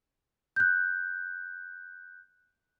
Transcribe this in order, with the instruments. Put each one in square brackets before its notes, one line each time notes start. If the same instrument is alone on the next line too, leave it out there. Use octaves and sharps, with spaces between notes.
[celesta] F#6 G6